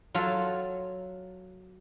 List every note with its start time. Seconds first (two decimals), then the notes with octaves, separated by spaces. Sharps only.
0.15 F#3 F4 A4